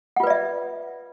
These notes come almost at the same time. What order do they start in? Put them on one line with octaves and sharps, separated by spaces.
F#5 F4 B4 D5 E5